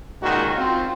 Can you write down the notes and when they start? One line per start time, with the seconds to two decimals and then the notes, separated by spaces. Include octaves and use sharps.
0.22 C#2 A#2 D#3 F#4
0.56 C4 F4